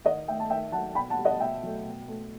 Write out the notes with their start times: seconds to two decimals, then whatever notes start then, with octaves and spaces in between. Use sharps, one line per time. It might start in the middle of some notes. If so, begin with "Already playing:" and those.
0.05 D#3 D#5 F#5
0.28 A3 E5 G5
0.40 A5
0.50 D#3 E5 G5
0.72 F#3 A3 F#5 A5
0.95 B2 G5 B5
1.10 F#5 A5
1.18 G3
1.25 D#5 F#5
1.40 B2 E5 G5
1.63 F#3 A3
1.85 B2
2.08 A3